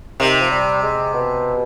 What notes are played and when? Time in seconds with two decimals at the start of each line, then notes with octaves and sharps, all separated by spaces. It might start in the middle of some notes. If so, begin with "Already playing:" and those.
0.20 C3 D#3
0.41 F3
0.51 G3
0.83 G#3
1.14 B2